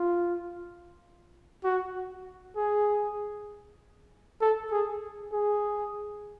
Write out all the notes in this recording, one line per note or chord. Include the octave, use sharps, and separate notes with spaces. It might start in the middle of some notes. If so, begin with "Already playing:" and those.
Already playing: F4
F#4
G#4
A4
G#4
G#4